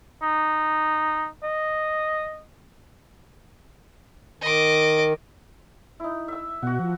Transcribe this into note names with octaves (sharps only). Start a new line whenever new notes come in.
D#4
D#5
D#3 D#5 D6
D#4 E4
E5 E6
B2 F#4 F#5
F3